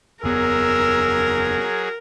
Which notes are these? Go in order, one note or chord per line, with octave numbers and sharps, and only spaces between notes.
F#1 E2 F#3 B3 G#4 A#4 E6